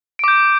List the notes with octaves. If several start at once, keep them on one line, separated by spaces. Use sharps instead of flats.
D6 G6 D7